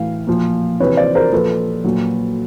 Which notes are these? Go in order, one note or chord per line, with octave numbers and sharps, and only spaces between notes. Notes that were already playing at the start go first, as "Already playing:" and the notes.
Already playing: A2 E3 F5
A#2 F3
C3 E3 B4 C#5
C5 D5
A#4 C5
A#2 F3 A4 B4
A#2 F#3